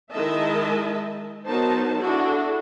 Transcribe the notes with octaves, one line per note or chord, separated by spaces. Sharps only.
D#3 G#3 E4 D#5 E5 A5
F#3 B3 D#4 A#4 C5 A5
D4 E4 F#4 G#4 A4